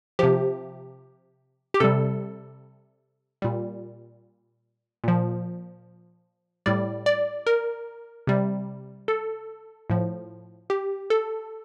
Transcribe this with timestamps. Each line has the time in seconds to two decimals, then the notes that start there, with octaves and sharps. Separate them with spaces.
0.19 C3 F3 G4
1.74 G4
1.80 C3 G3 A4
3.42 A#2 G3
5.04 A#2 F3
6.66 A2 G3 D5
7.06 D5
7.46 A#4
8.27 C3 G3
9.08 A4
9.90 A2 F3
10.70 G4
11.10 A4